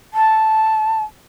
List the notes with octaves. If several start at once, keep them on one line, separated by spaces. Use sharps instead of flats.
A5